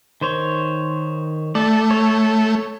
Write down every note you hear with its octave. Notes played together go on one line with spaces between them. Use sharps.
D#3 C5 C#5
A3 D5 A5
A4 C#5